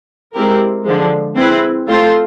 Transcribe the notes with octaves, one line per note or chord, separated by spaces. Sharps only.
G#3 C4 E4 G4 A#4
D3 F3 G#3
C4 E4 G#4 B4
A3 C4 F4 A4 C5